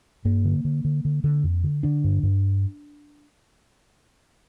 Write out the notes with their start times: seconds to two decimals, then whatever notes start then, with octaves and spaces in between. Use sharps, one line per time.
0.25 G2 A#3
0.45 D3
0.65 D3
0.84 D3
1.05 D3
1.24 D3
1.44 F2
1.64 D3
1.83 D3 D4
2.04 G2
2.23 G2